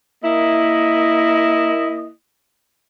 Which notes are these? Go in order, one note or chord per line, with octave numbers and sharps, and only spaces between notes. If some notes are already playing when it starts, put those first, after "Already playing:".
A#3 E4 D#5